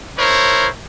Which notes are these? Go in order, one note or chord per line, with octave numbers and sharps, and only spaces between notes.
E4 A#4 C5 C#5